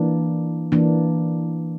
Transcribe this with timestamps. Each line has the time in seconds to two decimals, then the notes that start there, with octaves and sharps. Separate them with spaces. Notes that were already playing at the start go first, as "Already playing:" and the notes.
Already playing: E3 A#3 D4
0.72 E3 A#3 D4